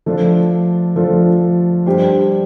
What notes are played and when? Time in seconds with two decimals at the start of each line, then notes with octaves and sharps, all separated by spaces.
0.06 F3 A3 D4 F4
0.96 F3 A3 D4 F4
1.86 G2 G3 D4 G4 C5